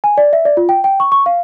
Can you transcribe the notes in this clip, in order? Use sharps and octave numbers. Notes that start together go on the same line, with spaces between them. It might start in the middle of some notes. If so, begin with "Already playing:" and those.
G#5
D5
E5
D5
F4
G5
G5
C#6
C#6
F5